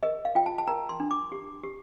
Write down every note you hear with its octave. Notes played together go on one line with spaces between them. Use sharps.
A#4 D#5
F5
F4 G5
A5
A5
A#4 A#5
C6
D4
D6
G4
G4